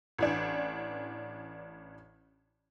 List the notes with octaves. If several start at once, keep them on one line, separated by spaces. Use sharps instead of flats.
A1 E3 D4